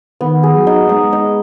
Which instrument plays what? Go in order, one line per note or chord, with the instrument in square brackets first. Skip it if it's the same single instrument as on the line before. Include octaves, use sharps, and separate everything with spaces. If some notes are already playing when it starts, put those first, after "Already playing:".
[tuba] D#3 [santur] B3
[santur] G#4
[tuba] F#3
[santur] D#4
[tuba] G#3 [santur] D#4
[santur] D#4